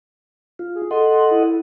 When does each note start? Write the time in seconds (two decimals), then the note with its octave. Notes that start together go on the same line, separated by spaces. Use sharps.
0.59 F4
0.75 G#4
0.91 A4 D#5 F#5 C6
1.31 E4